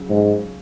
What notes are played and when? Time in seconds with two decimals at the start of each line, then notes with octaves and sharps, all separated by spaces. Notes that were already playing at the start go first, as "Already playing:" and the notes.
Already playing: C#3 F#3
0.10 G#2